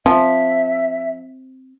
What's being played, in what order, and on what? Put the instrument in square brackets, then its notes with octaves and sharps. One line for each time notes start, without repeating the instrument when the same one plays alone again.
[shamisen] F3 [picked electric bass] C4 [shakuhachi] E5